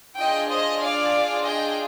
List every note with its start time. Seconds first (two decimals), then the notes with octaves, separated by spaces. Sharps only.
0.17 D4 F4 G#4 D#5 G5
0.49 C5 D#5
0.80 D5 F5
1.44 D#5 G5